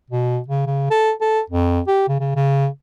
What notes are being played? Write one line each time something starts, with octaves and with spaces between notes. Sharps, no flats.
B2
C#3
C#3
A4
A4
F2
G4
C#3
C#3
C#3